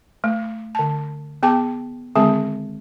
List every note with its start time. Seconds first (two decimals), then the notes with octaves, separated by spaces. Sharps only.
0.24 A3
0.75 D3 A5
1.43 B3 G#4 G5 A5 D6
2.16 D3 D#3 G#3 C4 G#4 A5